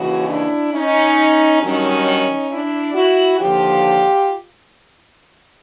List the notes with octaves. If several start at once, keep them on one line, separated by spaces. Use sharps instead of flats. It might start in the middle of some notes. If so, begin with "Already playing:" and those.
Already playing: D#2 C#3 E3 F#4 G#4
D4 E4
C#4 D#4
G2 D#3 F#3 C#4 D#4
D4 E4
E4 F#4
D#2 D3 F3 F4 G4